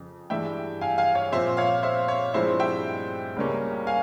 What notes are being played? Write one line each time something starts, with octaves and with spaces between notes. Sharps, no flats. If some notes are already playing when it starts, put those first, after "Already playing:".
Already playing: F2 C#3
G2 E3 G#3 E5 G5
F5 G#5
F5 G#5
C#5 F5
A#2 F3 C4 C5 E5
C#5 F5
C5 E5
C#5
G2 F3 G#3 C4 E4 C5 E5
E5 G5
C#2 C#3 G3 A#3 C#4
F5 G#5